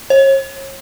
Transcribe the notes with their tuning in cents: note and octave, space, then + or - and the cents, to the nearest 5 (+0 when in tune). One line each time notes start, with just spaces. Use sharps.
C#5 -40